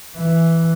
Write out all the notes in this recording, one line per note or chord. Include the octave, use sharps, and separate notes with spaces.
E3